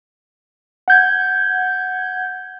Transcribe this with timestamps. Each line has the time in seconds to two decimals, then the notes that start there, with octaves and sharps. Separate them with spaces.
0.88 F#5 G6 G#6